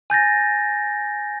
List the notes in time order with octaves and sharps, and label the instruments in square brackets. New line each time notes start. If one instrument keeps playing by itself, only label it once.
[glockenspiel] G#5 G6 A6 A#6